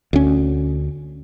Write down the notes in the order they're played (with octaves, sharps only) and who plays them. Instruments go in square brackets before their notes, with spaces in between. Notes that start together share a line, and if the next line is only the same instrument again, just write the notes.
[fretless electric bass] D2 C#4